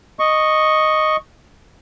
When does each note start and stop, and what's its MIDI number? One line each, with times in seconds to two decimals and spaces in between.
0.19 1.16 75
0.19 1.16 85